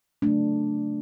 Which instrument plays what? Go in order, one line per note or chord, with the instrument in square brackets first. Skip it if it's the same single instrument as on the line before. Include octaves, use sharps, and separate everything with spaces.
[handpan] C#3 F#3 A3 D4